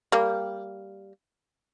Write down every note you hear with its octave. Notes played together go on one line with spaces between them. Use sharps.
G3 A#3